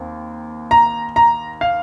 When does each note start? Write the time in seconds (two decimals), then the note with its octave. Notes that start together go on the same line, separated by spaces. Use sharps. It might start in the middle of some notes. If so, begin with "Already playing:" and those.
Already playing: D#2 C4
0.71 A#5
1.16 A#5
1.61 F5